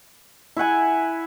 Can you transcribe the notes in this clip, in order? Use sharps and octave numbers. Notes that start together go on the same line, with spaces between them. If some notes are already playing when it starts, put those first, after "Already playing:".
E4 E5 F#5 G#5